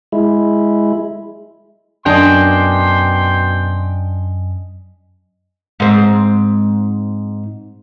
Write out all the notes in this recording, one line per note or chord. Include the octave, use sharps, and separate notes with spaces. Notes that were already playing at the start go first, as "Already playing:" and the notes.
G#3 E4
F#2 B2 D4 D#5 G5 G#5 C6
G#2 C4